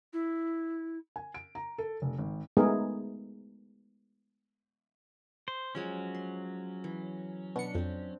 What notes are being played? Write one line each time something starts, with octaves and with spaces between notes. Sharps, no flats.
E4
G#5
D7
A#5
A4
F1
G#1
G#3 A3 B3 D#4 G#4 A#4
C5
F3 F#3 G#3 C#4 G#5
C6
E3
B2 D4 C#7
F2 C4 D4